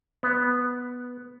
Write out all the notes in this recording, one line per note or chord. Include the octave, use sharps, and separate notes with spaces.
B3